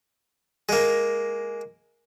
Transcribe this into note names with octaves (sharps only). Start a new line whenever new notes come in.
G#3 A#3